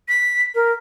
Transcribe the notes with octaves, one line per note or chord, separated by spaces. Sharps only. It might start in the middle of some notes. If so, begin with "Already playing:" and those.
B6
A#4